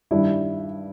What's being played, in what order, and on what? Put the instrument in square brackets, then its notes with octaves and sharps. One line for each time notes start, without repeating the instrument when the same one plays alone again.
[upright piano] G2 D#3 G3 D4 E4